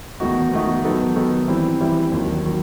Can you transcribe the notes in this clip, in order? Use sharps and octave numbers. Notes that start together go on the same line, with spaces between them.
E2 D#3 A3 D#4 F#4
E2 D#3 A3 D#4 F#4
D#3 F#3 B3 D#4 A4
D#3 F#3 B3 D#4 A4
E3 G3 C4 E4
E3 G3 C4 E4
D#2 D#3 F#3
D#3 F#3